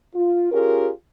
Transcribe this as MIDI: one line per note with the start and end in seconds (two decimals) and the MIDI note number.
0.15 0.50 65
0.52 0.89 61
0.52 0.89 65
0.52 0.89 67
0.52 0.89 68
0.52 0.89 70